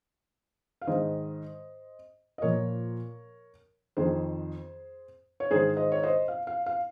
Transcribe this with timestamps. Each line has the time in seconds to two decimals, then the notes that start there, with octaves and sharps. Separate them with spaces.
0.81 F5
0.87 G#2 D#3 C5 D#5
2.38 D#5
2.42 A#2 F3 A#4 C#5
3.97 F2 D#3 G#4 C5
5.40 C#5
5.51 G#2 D#3 G#4 C5
5.77 C5 D#5
5.92 C#5
6.03 C5 D#5
6.28 F5
6.47 F5
6.66 F5